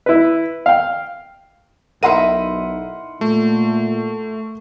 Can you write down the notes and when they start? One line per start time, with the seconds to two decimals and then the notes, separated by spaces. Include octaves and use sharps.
0.06 E4 B4
0.66 F5 G5
2.03 B1 D#4 E4 A#4 E5 F#5 C6 D#7
3.21 A#2 A3